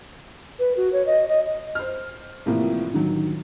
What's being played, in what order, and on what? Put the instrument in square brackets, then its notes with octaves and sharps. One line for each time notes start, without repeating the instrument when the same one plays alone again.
[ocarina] B4
F#4
C#5
D#5
D#5
[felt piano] C5 F6
C2 A2 E3 F3 A#3
D3 D#3 F#3